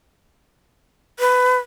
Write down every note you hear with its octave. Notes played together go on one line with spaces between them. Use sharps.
B4